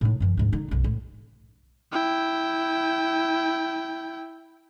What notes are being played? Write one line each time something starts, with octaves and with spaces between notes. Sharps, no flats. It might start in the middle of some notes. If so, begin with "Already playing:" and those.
A2 D#4
F#2 E3
D2 G#2
D3 D#4
B1 F#2
A2
E4 G5